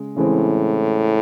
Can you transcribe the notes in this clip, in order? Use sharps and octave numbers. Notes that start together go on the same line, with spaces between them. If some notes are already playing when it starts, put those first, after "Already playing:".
Already playing: C#3 G#3
A2 C#3 E3 G#3 C4